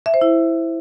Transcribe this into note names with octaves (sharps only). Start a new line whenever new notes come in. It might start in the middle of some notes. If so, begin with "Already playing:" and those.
E5
C5
E4